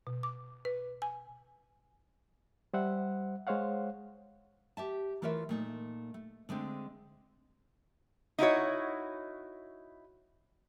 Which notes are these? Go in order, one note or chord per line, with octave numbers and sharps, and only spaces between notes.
B2
D6
B4
G#5
G3 C5 E5 F#5
G#3 C5 C#5 F5 F#5
G4 E5 A5
E3 A3 F4 A#4 C#5 E5
A#2 A3 D#4
A3
D3 G#3 A3 C4 D4
D#4 E4 F#4 C#5